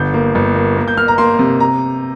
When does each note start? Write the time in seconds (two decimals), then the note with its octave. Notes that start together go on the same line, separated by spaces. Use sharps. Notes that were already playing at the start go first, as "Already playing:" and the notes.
Already playing: G1 D3 G6
0.14 A#3
0.35 G1
0.55 A#3
0.77 A#3
0.88 G6
0.97 A#3 F6
1.08 A#5
1.18 A#3 C6
1.39 C3
1.60 A#5